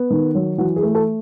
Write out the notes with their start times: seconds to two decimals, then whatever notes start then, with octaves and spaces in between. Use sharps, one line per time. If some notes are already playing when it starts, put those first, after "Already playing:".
Already playing: B3
0.10 D#3
0.35 F#3
0.58 E3 F#4
0.76 G#4
0.83 A3
0.95 A4